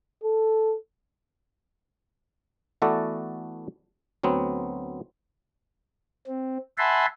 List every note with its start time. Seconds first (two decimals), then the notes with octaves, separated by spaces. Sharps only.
0.24 A4
2.82 E3 A3 B3 F#4 A4 D5
4.23 D2 F#3 B3 C4
6.27 C4
6.78 E5 F#5 G#5 A5 B5 C6